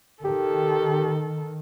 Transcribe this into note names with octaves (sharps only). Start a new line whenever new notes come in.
D#3 G4 A4